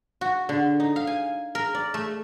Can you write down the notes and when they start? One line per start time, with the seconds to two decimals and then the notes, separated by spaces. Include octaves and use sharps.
0.21 F#4
0.49 D3
0.80 D#4
0.96 F5
1.07 G#5
1.55 A#4
1.74 D5
1.94 A3